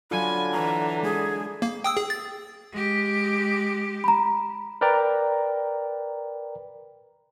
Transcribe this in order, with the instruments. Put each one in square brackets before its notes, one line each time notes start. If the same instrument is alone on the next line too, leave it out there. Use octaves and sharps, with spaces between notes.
[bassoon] D3 [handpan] F#3 F4 [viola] G#5 [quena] B5
[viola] E3 [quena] A#5
[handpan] G#3 D4 [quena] G#4
[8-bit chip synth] A#3
G5 D#6 E6
G#4
A6
[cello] G#3 G4
[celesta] A#5 B5
[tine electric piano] A#4 B4 D5 G5 A#5